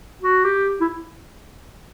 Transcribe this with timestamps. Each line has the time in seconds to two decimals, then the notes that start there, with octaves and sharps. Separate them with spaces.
0.22 F#4
0.45 G4
0.80 E4